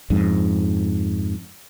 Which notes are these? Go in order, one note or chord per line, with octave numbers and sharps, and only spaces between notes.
F2 G#2